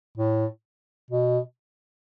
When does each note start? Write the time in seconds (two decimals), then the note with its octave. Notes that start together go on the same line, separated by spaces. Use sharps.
0.17 A2
1.11 B2